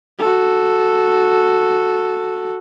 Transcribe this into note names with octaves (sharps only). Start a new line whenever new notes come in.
F#4 A4